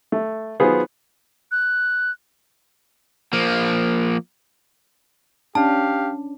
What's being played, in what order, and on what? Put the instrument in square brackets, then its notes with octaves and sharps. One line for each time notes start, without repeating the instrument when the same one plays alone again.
[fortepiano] A3
D#3 F#3 B3 F4 G#4 C5
[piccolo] F#6
[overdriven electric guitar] F3 A#3
[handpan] C#4 D4 [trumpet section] G4 F5 [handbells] A5